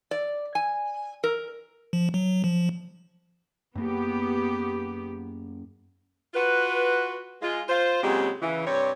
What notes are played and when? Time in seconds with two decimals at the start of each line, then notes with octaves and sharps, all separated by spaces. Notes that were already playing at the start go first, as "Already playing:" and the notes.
0.11 D5
0.55 G#5
1.24 A#4
1.93 F3
2.14 F#3
2.44 F3
3.76 F#2 A#3 B3 G4
6.34 F4 F#4 B4
7.42 G#3 F4
7.68 F4 C5
8.03 A#2 C#3 F#3 G#3 C4 G4
8.42 C#3 E3
8.65 G2 C3 G4 C#5